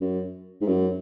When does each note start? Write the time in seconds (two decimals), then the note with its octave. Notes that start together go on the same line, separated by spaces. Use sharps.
0.01 F#2
0.61 G#2
0.67 F#2